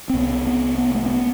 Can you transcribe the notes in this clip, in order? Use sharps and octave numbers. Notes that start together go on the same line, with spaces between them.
C4
C2 C3 B3
B3
B3
A3
C4
B3